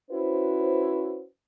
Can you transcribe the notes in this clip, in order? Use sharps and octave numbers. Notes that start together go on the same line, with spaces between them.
C#4 E4 F#4 B4 C5